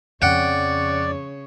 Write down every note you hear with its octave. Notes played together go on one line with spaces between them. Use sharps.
F2 C#3 C#5 D5 F#5 G5